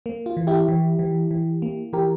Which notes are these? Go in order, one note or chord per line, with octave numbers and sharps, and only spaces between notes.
A#3
F4
E3
E4 G4
E3
E3
E3
A#3
E3 G4 A#4